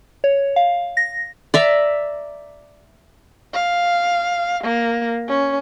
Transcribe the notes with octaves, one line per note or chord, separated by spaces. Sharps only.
C#5
F5
A#6
D5 E5 A#5
F5
A#3
C#4